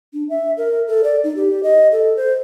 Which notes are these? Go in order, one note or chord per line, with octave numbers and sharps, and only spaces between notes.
D4
E5
A#4
A4
D5
D#4
G4
D#5
A4
C5